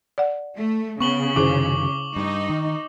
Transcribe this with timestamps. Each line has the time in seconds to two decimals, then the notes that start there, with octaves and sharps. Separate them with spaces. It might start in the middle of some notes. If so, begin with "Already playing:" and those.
0.18 D5 F#5
0.57 A3
1.00 C#3 B3 C#6 F#7 G7
1.36 F#2 C3 D#3 E4 G#4 C5 D6
2.16 G2 D#4
2.50 D#3